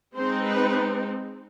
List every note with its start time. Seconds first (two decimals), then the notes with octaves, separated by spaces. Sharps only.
0.15 G#3 C4 D#4 C5
0.43 B4